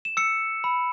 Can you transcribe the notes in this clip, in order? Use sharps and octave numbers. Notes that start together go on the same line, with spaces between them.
E7
E6 C#7
B5